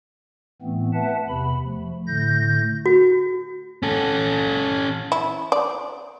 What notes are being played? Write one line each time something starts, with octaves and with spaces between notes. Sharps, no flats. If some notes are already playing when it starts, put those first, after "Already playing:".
A2 E3 A3 B3 C4
B4 E5 F#5 A5
E2 C3 B5
F3 A3
A2 D3 A3 G6 A#6
F#4
C#4 A4
E4
D5